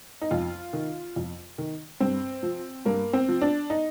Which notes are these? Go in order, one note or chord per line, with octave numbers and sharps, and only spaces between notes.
D#4
F2 F4
D#3
F2
D#3
G2 C4
F3
G2 A#3
C4
F3
D4
D#4